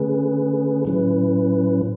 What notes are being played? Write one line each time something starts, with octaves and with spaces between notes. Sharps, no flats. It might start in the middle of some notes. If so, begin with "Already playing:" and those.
Already playing: D3 A3 C#4 G#4 B4
A2 F#3 C#4 E4 B4